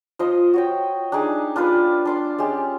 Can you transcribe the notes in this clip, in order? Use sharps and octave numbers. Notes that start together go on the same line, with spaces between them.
F3 C5 D#5
F#4 C#5 G5
D4 D#4 G4 G#4
D4 F4 G4 B4
D4 C6 D6
G#3 C#4 G4